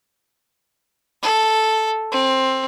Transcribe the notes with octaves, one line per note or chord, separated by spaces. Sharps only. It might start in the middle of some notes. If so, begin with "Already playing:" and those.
A4
C4